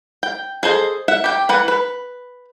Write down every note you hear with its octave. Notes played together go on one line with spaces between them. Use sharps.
G5
G#4 A4 C5 D#5
E5 F#5
G4 G5
E3 B4 F#5
B4